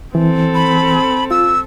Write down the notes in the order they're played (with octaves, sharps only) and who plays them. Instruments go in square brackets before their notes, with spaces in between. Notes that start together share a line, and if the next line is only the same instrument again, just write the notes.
[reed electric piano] E3 [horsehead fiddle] C4 A4
[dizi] B5
[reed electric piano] F4 [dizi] E6